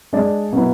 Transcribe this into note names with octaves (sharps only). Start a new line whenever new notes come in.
G#3 D4 G#4 D5
B2 F#3 C#4 E4 B4